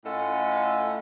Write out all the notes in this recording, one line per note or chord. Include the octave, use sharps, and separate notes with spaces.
A2 C#4 F4 A4 D#5 F#5